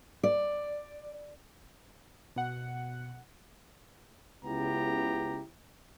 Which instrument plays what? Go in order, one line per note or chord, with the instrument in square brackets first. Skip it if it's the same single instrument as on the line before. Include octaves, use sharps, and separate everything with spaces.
[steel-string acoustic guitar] D5
[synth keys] B2 F#5
[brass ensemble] C#2 C#3 B3 E4 G4 A#5